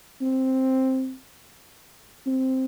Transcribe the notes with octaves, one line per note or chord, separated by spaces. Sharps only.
C4
C4